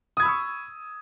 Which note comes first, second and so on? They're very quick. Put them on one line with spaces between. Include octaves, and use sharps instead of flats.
D#6 G#6 B5 E6 C#6